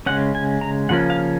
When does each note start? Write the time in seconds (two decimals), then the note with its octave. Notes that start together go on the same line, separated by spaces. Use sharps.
0.06 C#3 G#3 C#4 F#5
0.35 G#5
0.61 A#5
0.89 C#3 F3 A#3 C#4 F#5
1.10 F5